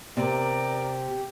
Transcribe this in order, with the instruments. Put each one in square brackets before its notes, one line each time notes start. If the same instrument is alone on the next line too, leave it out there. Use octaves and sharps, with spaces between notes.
[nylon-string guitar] C3 [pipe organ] G4 [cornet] A#4 [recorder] D5